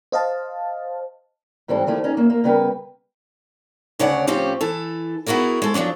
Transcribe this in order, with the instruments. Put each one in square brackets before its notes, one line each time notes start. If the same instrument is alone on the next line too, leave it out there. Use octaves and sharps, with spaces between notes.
[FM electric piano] C5 D#5 F5 A5
[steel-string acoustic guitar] G#2 E3 G3 C4 A4
D#3 F3 A3 E4 G4
C#4 D#4 G#4
F#2 A#3 E5
A#3
C#3 G3 B3 A#4 B4 G5
D2 C#3 C#5 D5 F#5
A2 F3 C4 C#4 G4
E3 A4
B3 E4 F#4 G#4 A#4
G#3 A4
F3 F#3 G#3 C#4 D4